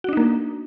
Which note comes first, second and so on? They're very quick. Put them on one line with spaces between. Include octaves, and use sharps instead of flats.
F#4 D4 D#4 A#3